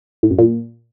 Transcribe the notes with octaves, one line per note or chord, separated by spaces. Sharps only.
A2
F#2
A#2